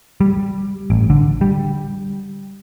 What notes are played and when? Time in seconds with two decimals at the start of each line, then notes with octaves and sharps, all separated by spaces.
0.21 G3
0.90 A1
1.10 D3
1.41 G3